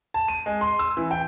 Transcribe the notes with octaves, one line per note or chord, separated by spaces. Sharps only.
A5
D#7
G#3
C6
E6
E3
G5